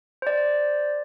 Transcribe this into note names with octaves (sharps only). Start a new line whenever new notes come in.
C5 D5